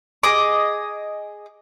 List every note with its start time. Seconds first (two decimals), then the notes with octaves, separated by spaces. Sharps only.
0.23 G#4 D#5 D6